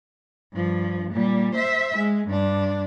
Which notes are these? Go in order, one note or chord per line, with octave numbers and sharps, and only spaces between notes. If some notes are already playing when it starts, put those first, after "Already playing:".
G2 F3
A#2 G3
C5 E5
G#3
G2 D4